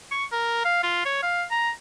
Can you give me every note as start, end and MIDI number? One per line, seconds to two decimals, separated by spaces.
0.11 0.25 85
0.32 0.63 70
0.65 0.82 77
0.83 1.03 65
1.05 1.19 73
1.23 1.44 77
1.51 1.70 82